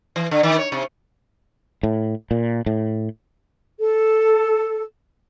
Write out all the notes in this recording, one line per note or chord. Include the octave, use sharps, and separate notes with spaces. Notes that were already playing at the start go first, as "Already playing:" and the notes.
E3
D3
D#3
C#5
C3
A2
A#2
A2
A4